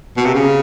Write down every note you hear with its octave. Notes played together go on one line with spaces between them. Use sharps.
B2
C3
C#3